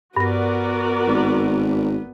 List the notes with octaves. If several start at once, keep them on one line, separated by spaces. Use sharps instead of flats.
G2 B3 F#4 A#4 D5 A#6
G#1